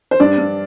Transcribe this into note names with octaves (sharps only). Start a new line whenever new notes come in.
C5
G2 D4 D5
G2